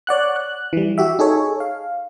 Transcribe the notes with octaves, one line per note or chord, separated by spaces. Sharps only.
C#5 D5 F#5 F#6
F#6
E3 G3
F#4 G4 E5
D#4 G#4 A4 C#5
F5